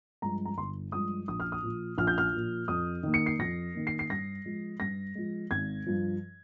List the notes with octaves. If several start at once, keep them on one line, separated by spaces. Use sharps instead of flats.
G2 F3 G#3 A#5
A#5
G1 C6
G2 F3 G#3 D#6
A#1 D#6
F6
D#6
A#2 F3
A#1 F6
G6
F6
A#2 F3
F2 D#6
D#3 A#3
C#7
C7
F2 A#6
D#3 A#3
C7
C7
G2 A#6
F3 G#3
G2 A#6
F3 G#3
G#1 G#6
G2 F3